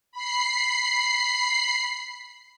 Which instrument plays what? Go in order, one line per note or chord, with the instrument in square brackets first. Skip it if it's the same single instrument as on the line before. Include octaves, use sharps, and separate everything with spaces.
[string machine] B5 C7